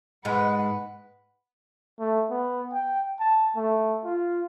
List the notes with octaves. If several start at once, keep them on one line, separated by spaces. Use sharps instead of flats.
G#2 G#3 B4 F#5
A3
B3
G5
A5
A3
F4